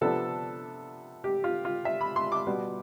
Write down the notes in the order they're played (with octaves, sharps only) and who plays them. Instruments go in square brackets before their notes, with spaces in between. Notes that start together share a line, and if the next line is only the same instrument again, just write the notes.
[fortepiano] C3 F3 B3 D4 A4
G4
F4
F4
E5
B5
C6
D6
B2 G3 B3